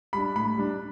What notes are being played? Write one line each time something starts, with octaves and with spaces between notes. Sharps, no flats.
G3 D4 B5
A2 B5
G3 D4